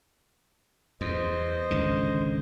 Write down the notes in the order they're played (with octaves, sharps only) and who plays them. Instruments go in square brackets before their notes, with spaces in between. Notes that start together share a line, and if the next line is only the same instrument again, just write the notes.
[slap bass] E2 [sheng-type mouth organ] C5 D#5
[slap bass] G#1 C#2 D3